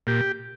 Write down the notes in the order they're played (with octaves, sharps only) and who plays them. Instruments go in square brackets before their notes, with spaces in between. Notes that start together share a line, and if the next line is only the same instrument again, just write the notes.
[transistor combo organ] A#2 G4